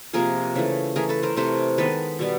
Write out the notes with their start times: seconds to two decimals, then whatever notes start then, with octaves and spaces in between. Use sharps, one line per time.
0.13 C3 F3 A#3 G#4 A#4
0.56 C#3 E3 A3
0.96 E3 A3 G#4 A#4
1.09 A4 B4
1.23 A#4 C5
1.37 C3 E3 A3 A#4 C5
1.78 D#3 G#3 B3 A4 B4
2.19 B2 G3 B3